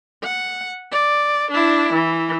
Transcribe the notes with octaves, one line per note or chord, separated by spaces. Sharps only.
F#5
D5
D4 E4
E3